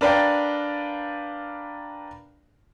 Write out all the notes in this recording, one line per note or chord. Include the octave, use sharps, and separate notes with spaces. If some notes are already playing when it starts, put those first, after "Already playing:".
D4 A#4 B4 D5 F5 G5